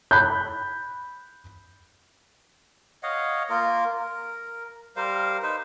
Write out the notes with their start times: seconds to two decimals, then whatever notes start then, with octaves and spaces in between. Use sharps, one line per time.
0.11 B5 F#6 G6
3.03 C#5 D#5 F5 F#5
3.50 A#3 F4 A#4
3.99 A#4
4.96 G3 A#4 C5 F5
5.42 D#4 B4 C5